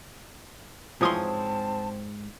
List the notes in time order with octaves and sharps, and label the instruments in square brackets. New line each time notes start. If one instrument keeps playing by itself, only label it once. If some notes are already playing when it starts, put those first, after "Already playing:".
[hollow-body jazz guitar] G#2 C#5 C6 [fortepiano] E3 F3 D#6 [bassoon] C4 [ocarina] A5